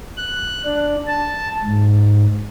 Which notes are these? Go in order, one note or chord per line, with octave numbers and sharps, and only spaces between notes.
F#6
D4
A5
G#2